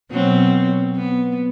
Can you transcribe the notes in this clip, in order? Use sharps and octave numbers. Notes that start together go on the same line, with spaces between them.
B2 F#3 C4
B3